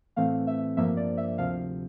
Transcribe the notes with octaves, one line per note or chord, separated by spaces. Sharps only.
A2 E3 A3 C4 F5
E5
G2 F3 A#3 E5
D5
E5
D2 C3 F3 F5